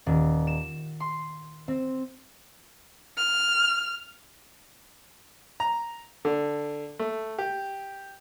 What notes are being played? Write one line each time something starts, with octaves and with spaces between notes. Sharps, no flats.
D#1
E7
C6
C4
F6
A#5
D3
A3
G4